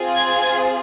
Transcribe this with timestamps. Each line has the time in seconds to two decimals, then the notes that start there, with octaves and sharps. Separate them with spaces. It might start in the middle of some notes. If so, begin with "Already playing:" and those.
Already playing: C4 F4 G#4
0.15 G#6